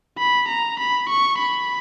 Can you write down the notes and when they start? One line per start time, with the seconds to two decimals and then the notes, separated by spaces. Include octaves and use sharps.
0.19 B5
0.48 A#5
0.79 B5
1.09 C#6
1.40 B5